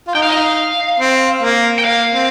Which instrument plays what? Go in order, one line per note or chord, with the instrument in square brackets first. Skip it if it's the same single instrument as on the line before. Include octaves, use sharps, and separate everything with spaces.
[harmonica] F4
[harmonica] D#4 [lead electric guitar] G5
[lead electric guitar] F5
D#5
F5
[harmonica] C4
A#3
[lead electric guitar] G5
[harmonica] A#3 [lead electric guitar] F5
[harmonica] C4